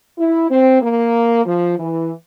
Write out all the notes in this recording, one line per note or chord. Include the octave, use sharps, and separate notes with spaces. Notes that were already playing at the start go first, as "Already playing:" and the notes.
E4
C4
A#3
F3
E3